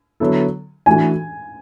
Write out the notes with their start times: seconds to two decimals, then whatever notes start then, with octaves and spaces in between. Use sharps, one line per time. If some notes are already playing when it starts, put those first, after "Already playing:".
0.20 D3 F#3 B3 E4 A4
0.86 E3 A3 D4 F#4 G#5